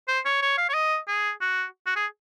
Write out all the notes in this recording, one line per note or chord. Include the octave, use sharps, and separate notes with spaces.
C5
C#5
C#5
F5
C#5
D#5
G#4
F#4
F#4
G#4